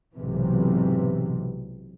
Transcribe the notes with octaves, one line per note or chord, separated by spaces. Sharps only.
B1 G#2 C3 E3